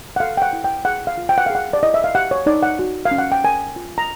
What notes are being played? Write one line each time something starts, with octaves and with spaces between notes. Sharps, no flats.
F#5
A4 F5
G5
F#5
E4
G5
G#4 F#5
F5
F4
G5
F#5
G#4 F5
F#5
D5
E4 D#5
E5
F5
G4 F#5
C#5
D#4 D5
F#5
F#4
F5
C#4
F#5
G5
A#4 G#5
F4
A#5